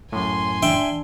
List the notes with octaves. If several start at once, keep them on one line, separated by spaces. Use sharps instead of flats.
F#2 A2 G#5 C6
D4 E5 G5